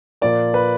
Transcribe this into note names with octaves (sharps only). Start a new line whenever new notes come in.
A#2 F3 A#3 D5
B4